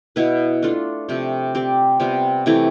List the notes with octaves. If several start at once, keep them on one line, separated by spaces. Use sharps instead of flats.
B2 B3 E4 B4
A3 D4 F4 A4
C3 F3 A3
C4 G4 D5
C3 G3 B3 F4
C3 E3 A3 E4